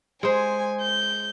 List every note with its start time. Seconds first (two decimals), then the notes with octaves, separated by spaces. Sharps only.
0.23 G#3 C5 G#5
0.81 G6